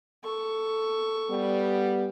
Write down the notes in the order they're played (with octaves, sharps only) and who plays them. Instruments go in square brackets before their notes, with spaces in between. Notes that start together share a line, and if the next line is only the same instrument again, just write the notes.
[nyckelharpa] A4 C#6
[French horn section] G3 B3